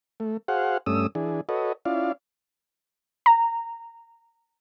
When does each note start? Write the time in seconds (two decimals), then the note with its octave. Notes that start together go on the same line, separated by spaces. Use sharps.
0.20 A3
0.48 F#4 G#4 C5 F5 F#5
0.86 G2 A3 C#4 D#6 E6
1.15 E3 D4 G#4
1.49 F#4 A4 B4 C#5 D#5
1.85 C#4 E4 F4 D5 F5
3.26 A#5